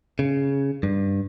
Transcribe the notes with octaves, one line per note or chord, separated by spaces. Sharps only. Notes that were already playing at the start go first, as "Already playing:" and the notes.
C#3
G2